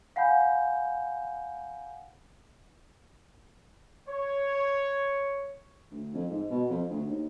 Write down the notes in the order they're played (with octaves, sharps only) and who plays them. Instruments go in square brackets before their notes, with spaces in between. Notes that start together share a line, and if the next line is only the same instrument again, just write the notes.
[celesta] F5 F#5 G#5 B5 G6
[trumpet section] C#5
[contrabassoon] D2
F2
G#2
B2
F2
D2
D#2